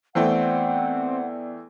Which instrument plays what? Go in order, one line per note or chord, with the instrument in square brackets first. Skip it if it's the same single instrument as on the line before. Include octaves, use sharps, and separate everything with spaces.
[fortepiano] E2 A3 G5 [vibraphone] B3 D5 [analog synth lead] C4 [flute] F#5